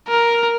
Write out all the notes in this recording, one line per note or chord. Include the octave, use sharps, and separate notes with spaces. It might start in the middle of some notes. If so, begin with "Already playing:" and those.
A#4